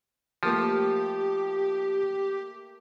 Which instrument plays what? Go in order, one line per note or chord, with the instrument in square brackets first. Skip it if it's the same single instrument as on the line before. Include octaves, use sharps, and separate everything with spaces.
[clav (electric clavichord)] F3 [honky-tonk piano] A3 A#3 A4 [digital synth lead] G4